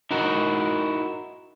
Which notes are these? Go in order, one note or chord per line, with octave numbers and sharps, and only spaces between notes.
D#4 E4 F#4 A#4